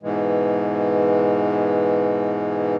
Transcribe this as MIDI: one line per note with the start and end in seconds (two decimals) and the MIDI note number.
0.03 2.76 44
0.03 2.76 47
0.03 2.76 52
0.03 2.76 56